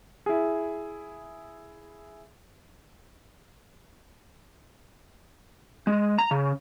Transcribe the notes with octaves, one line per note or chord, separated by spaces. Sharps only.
E4 G#4
G#3
A#5
C#3